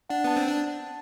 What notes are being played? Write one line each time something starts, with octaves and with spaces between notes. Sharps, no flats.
D4 F#5
B3 A5
C4
A5
D4